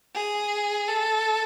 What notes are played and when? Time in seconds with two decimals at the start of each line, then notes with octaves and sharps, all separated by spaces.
0.15 G#4
0.88 A4